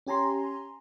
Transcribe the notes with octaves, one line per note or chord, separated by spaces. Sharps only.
C#4 G4 G#5 A#5 C6